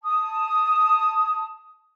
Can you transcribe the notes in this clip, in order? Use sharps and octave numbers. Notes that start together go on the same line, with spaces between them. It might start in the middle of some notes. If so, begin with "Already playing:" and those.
A5 D#6